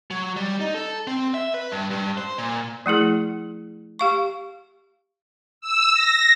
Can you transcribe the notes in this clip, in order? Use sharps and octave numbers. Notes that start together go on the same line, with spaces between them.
F#3
G3
D#4
A4
C4
E5
B4
G2
G2
C5
A#2
F3 A3 E4 G#4
G4 F5 C#6
E6
A#6